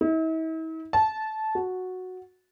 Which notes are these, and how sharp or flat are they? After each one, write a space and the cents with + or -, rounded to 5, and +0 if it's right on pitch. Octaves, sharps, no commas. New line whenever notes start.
E4 -45
A5 -15
F#4 -5